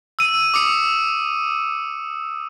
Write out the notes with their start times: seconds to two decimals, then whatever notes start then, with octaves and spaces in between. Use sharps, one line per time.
0.19 E6 D#7
0.54 D6 D#6 C#7